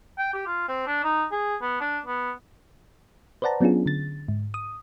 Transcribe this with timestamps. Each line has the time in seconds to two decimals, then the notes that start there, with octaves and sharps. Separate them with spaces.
0.18 G5
0.33 G4
0.46 F4
0.68 C4
0.87 D4
1.04 D#4
1.32 G#4
1.61 B3
1.80 D4
2.06 B3
3.42 B4 C5 D5 F#5 A5 A#5
3.60 F#3 B3 C#4 D4 F4 G#4
3.86 D3 A6
4.28 G#2
4.54 D#6